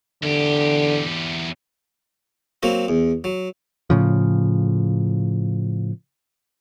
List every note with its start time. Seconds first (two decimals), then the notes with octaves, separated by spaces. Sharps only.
0.23 E2 D3 G4
2.63 F#3 A#3 C4 F#4
2.88 E2
3.24 F#3
3.90 A2 C#3 F3